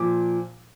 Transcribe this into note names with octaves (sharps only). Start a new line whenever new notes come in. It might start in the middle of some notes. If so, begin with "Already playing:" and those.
Already playing: A#2 F3 D6